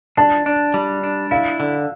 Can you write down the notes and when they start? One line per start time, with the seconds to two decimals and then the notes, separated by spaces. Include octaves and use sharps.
0.17 D4 A5
0.46 D4
0.74 G3
1.03 D4
1.31 E4 F5
1.60 D3